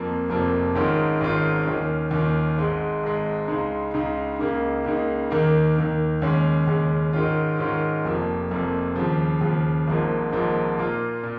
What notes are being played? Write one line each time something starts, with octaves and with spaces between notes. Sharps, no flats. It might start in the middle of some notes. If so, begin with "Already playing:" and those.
Already playing: F2 F3 A#3
F1 F2 F3 A#3
G#1 G#2 D#3 C#4 F4
G#1 G#2 D#3 C#4 F4
D#2 D#3 C#4 F4
D#2 D#3 C#4 F4
G#1 G#2 G#3
G#1 G#2 G#3
C#2 C#3 G#3 D#4
C#2 C#3 G#3 D#4
C#2 C#3 A#3 D#4
C#2 C#3 A#3 D#4
D#2 D#3 A#3
D#2 D#3 A#3
D#2 C#3 G#3 C#4
D#2 C#3 G#3 C#4
G#2 D#3 C#4 F4
G#2 D#3 C#4 F4
F1 F2 F3 A#3
F1 F2 F3 A#3
D#2 C#3 F3
D#2 C#3 F3
G#1 G#2 F3 A#3
G#1 G#2 F3 A#3
A#2 A#3 F4
A#2